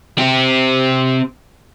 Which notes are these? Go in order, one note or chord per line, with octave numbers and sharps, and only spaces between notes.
C4 G4